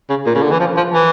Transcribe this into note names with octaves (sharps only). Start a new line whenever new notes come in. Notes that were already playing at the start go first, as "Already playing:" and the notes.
C#3
A#2
C#3
D3
E3
F3
F3
E3